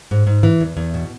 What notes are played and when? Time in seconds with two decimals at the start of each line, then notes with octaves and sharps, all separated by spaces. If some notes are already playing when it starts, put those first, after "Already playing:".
0.11 G#2
0.27 G#2
0.43 E3
0.60 E2
0.77 E2
0.94 B2